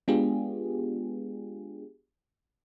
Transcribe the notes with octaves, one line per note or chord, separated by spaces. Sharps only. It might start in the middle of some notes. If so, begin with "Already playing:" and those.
G#3 B3 D4 F4 G4 G#4